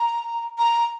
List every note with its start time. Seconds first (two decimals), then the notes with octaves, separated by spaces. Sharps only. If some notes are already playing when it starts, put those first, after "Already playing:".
Already playing: A#5
0.58 A#5